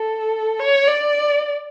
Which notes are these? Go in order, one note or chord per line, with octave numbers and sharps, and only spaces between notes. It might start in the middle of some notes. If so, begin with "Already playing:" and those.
Already playing: A4
C#5
D5